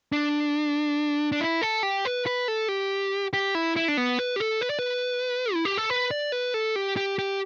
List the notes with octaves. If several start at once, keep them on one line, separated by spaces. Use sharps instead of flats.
D4
D4
E4
A4
G4
B4
B4
A4
G4
G4
E4
E4
D4
B3
B4
G4
A4
B4
D5
B4
E4
G4
A4
B4
D5
B4
A4
G4
G4
G4